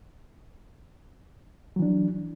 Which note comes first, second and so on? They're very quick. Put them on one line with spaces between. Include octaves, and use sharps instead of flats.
F#3 E3 D4